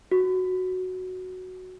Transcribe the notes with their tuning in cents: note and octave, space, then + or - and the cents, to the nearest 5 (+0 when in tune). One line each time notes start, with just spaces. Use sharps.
F#4 +0